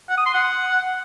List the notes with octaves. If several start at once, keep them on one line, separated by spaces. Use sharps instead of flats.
F#5
D#6
C6
F#5